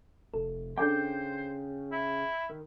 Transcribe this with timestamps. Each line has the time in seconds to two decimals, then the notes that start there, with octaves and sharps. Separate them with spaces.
0.34 F1 A4
0.78 C#3 D4 A4 C5 G5 D6 G6
1.92 E4
2.49 D#3